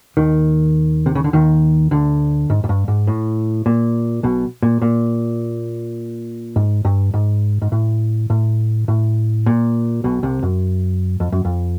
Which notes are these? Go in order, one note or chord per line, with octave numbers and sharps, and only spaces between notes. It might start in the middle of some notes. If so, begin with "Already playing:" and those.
D#2 D#3
C3
C#3
D3
D#2 D#3
D2 D3
G#2
G#2
G2
G#2
A2
A#2
B1 B2
A#2
A#2
G#2
G2
G#2
G#2
A2
A2
A2
A#2
B1 B2
C2 C3
F#2
F2
F#2
F2